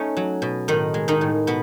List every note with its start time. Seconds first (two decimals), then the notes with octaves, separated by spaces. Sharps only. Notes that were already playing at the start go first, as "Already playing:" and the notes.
Already playing: A3 C#4 D#4
0.17 F#3
0.42 B2
0.68 A2 D#3 D#4
0.94 G#3
1.08 D#3 D#4
1.21 A2
1.47 B2 B3